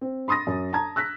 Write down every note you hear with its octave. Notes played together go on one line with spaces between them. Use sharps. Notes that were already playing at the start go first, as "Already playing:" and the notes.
C4
B5 C6 D#6 A6 A#6
F#2
A5 A#5 G#6
E6 F#6 A#6 B6